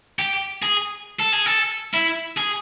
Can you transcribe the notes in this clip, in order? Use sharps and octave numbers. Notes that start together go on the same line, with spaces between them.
G4
G#4
A4
G#4
A4
E4
G#4